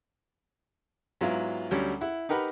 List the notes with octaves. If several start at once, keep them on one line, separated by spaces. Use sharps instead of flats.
G#2 F#3 B3 E4 F4
D2 F#3 G3 C#4
E4 F#5
D#4 G4 A#4 B4 F#5 B5